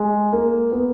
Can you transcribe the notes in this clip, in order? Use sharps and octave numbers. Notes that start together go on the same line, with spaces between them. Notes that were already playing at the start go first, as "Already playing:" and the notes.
Already playing: G#3
A#3
B3